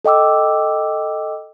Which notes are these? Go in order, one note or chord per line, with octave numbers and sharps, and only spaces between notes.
A4 D#5 G5 D6 E6